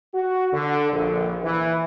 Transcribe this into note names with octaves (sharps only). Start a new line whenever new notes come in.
F#4
D3
A#1
E3